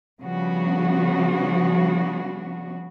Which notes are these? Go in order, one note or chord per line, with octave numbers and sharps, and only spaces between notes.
C#3 F3 G3 B3 D4 F#4